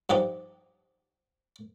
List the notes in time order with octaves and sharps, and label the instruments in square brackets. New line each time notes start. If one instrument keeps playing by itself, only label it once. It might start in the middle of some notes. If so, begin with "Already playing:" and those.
[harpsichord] G2 F3 D#4 G4